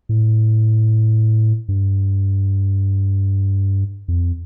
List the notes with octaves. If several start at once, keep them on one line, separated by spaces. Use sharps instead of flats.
A2
G2
F2